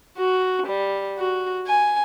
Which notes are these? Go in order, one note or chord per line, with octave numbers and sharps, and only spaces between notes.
F#4
G3
F#4
G#5